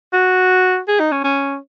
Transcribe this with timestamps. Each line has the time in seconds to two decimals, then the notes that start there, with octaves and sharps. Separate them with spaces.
0.13 F#4
0.88 G#4
1.00 D#4
1.12 C#4
1.24 C#4